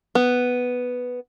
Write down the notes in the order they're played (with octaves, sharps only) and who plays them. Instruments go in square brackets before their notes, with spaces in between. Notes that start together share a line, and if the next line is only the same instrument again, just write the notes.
[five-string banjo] B3